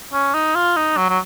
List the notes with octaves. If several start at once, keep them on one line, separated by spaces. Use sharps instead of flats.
C#4
D#4
F4
D#4
F#3
F#3